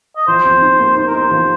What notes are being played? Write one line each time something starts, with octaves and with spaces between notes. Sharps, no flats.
D#5
F3 C5
F2
D#4
A#3
D#4 C5
A#4
D#4 C5
F3